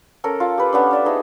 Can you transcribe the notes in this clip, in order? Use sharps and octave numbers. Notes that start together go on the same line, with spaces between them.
C#4 A4 A#4
F4
G4 B4
B3 C#4 D4
D4 D5 E5
A3 C4 D#4 G#4